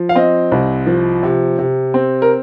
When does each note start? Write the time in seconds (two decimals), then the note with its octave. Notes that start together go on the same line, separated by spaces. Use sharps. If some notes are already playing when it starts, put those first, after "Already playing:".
Already playing: F3
0.09 F5
0.15 C4 D#5
0.52 C2
0.87 F3
1.23 C3
1.59 C3
1.94 C4
2.22 A#4